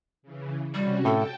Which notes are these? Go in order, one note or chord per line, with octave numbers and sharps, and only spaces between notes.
C#3 E3
C3 G3 C#4 F#4
A2 A4 G5 A5